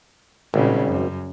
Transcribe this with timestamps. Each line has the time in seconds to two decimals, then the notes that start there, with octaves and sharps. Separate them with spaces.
0.54 G#1 A#2 C#3 G3
0.88 F#2